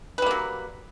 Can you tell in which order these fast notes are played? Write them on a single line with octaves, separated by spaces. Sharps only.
B4 G3 A#3 F#3